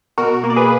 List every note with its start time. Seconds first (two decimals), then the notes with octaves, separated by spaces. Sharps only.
0.18 B2 F#4 A#4
0.44 A#3
0.50 D5
0.56 G#4 B4